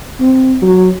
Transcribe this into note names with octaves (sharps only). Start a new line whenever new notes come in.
C4
F#3